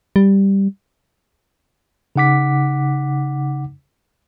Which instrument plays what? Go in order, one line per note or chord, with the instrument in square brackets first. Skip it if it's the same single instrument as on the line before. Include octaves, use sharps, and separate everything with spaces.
[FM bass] G3
[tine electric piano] C#3 D#4 F#5 D6 B6